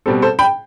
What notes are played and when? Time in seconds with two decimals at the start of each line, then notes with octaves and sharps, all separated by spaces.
0.06 B2 G3 C4 A4
0.22 A4 C5
0.39 G5 B5